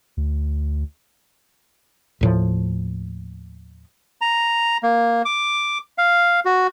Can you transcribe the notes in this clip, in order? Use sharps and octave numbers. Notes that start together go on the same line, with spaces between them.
D2
D#2 A2 F3
A#5
A#3
D6
F5
F#4